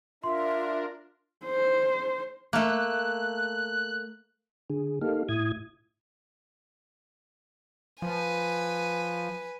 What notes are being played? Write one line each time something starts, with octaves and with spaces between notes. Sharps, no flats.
D4 F4 A#4 E5 C6
C5
A3 A#3 F#6
D3 G#4
A#3 D#4 G4 A4 F5
A2 E4 D#6 G#6
F3 B4 G#5